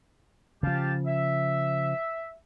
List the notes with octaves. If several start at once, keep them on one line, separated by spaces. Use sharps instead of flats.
C#3 F3 G4 F5 A5
E5